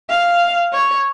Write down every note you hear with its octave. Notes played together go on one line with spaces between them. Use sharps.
F5
C#5